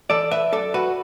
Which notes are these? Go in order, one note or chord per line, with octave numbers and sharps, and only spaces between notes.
E3 A4 D5
B4 E5
F#2 A4 D5
F#4 B4